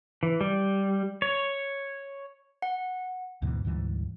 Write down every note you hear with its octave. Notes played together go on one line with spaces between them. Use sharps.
E3
G3
C#5
F#5
D2 G#2 B2 E3
D2 G#2 E3 G3